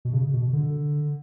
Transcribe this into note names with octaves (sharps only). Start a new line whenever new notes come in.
B2
C#3
B2
D3